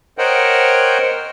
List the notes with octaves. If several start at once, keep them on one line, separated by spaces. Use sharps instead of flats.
A#4 C5 C#5 D#5 F#5 G5